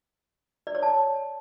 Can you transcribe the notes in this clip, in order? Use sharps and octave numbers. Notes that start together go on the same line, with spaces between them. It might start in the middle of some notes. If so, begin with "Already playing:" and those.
D5
C#5
A5